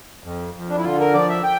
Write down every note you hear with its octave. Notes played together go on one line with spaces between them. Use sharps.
F2
F2
D4
E4
D3 F4
A#4
F3 D5
E5
G5